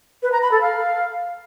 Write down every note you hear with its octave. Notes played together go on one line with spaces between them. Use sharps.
B4
A#5
B5
A4
F5